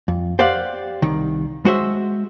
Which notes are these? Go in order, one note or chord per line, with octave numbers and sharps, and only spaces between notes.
F2
G4 C5 D5 F5 F#5
C2 D#3
G#3 F#4 C5 E5